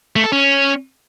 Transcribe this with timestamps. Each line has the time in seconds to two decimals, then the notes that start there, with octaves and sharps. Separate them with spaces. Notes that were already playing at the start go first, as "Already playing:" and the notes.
0.16 A3
0.24 A4
0.32 C#4